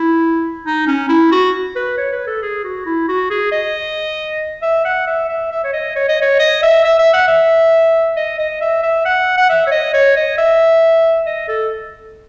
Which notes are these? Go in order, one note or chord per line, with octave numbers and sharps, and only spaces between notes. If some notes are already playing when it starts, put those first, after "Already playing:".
Already playing: E4
D#4
C#4
E4
F#4
B4
C#5
B4
A4
G#4
F#4
E4
F#4
G#4
D#5
E5
F#5
E5
E5
E5
C#5
D#5
C#5
D#5
C#5
D#5
E5
E5
E5
F#5
E5
D#5
D#5
E5
E5
F#5
F#5
E5
C#5
D#5
C#5
D#5
E5
D#5
A4